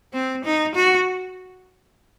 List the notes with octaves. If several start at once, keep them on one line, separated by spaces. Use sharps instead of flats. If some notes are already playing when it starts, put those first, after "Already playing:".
C4
D#4
F#4